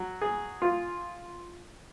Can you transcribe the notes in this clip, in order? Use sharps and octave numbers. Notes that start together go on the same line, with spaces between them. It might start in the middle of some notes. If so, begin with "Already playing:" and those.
Already playing: F#3
G#4
F4